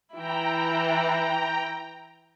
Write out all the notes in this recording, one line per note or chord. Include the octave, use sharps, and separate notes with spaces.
E3 E4 G5 A#5